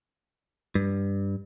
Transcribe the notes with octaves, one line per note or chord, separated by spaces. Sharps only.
G2